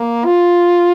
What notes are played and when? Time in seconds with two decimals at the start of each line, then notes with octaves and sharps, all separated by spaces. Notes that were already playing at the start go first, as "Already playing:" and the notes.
Already playing: A#3
0.25 F4